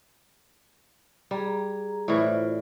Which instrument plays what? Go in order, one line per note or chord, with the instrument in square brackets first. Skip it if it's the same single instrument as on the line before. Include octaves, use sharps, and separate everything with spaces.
[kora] G3 [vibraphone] G#4 A#5
[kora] A2 E3 [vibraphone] F4 C5 D5